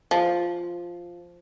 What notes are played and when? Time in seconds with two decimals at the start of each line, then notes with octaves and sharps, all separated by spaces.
0.11 F3